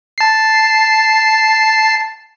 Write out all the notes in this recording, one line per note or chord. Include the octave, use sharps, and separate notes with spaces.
A5 C7